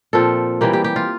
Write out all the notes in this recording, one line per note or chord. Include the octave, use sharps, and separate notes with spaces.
A#2 F3 C4 F4 A4
E3 G3 A#3 G4
G4
G4
F4